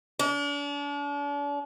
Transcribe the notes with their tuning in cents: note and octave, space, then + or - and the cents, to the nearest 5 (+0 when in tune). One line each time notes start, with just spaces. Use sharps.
D4 -40